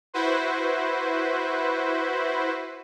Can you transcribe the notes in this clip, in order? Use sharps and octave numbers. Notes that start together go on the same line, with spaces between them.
E4 F#4 B4 C5